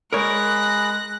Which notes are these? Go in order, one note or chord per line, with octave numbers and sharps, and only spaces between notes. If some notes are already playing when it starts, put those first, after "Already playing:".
G#3 G#4 A#4 C#5 B5 F#6 A#6